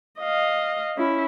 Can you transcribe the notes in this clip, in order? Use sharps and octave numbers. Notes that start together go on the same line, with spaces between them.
D#5 F5
C#4 E4